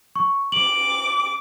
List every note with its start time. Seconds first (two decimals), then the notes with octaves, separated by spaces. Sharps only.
0.16 C#6
0.52 D6 F#7